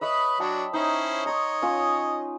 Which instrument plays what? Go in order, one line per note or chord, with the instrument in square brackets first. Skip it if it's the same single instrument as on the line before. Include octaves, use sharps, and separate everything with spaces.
[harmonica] B4 B5 [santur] C#5 D#5 E5
[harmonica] F#3 D4 F#4 [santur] G5 A5 B5
[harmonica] C#4 E4 C5 [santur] D#4
[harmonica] C#5 D#5 [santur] A#5 C6
[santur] C#4 F4 D#6